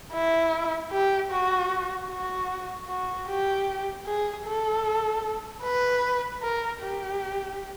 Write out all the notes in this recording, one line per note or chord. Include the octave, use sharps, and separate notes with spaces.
E4
G4
F#4
F#4
F#4
G4
G#4
A4
B4
A#4
G4